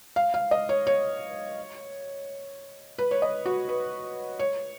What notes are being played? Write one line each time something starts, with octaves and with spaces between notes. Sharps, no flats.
F5
F5
D#5
C#5
C#5
B4
C#5
D#5
F#4
B4
C#5